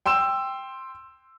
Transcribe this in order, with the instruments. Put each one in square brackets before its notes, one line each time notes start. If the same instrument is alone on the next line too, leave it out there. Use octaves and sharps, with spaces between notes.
[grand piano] G5 C6 E6 E7